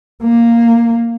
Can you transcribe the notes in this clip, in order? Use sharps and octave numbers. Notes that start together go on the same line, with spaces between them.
A#3